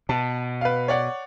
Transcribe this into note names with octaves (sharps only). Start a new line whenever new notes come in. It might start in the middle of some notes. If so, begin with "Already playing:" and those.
B2 A5
B4 F5
C#5 D5 F#5